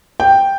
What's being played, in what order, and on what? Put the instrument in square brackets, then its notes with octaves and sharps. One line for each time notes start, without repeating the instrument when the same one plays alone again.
[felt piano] G5